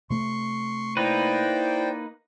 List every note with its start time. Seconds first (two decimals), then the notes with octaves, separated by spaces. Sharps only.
0.10 C3 A3 C6 C#6
0.97 A#3 D#4 E4 B4 C5 D5 G5